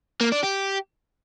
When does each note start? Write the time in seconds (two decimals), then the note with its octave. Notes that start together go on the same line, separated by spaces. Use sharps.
0.21 A#3
0.32 D4
0.43 G4